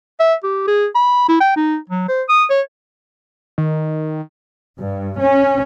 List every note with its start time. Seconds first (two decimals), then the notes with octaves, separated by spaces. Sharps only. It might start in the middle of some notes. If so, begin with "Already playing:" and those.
0.20 E5
0.43 G4
0.67 G#4
0.95 B5
1.28 E4
1.40 G5
1.56 D#4
1.89 F#3
2.08 C5
2.29 D#6
2.50 C#5
3.58 D#3
4.81 G2
5.22 C#4